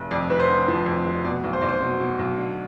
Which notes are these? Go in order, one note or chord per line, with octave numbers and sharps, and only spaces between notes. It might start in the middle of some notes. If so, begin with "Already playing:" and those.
Already playing: F1
F2 D5
F1 B4
C5
D3
F3
F2
F1
B2 D5
B1
C5
B1 D5
C5
B2
B2
B1
D3